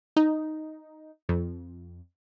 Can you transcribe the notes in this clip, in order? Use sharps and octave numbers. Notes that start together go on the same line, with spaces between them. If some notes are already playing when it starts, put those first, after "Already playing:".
D#4
F2